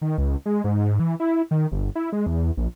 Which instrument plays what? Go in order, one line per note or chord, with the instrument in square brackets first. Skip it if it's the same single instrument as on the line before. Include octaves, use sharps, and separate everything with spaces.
[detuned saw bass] D#3
C#2
G#3
G#2
E3
E4
D#3
G1
E4
G#3
E2
A#1